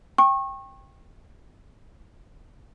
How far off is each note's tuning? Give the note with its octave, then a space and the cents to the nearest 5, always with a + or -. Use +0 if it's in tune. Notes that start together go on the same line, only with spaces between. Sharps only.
G5 +10 C#6 -30